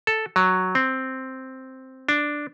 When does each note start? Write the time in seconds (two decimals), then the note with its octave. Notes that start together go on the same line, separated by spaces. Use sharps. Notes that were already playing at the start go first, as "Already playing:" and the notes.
0.07 A4
0.36 F#3
0.75 C4
2.09 D4